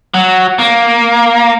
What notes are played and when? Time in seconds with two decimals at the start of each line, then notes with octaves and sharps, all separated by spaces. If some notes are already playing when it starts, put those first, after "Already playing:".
0.14 F#3
0.59 A#3